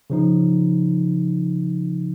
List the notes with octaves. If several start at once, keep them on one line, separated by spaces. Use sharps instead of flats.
C#3 F3 D#4